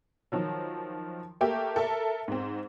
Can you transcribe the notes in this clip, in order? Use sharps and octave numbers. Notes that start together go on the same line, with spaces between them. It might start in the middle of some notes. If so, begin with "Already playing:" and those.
D#3 F3 F#3
A3 A#3 G4 A#4
A4 A#4 E5
G#2 C4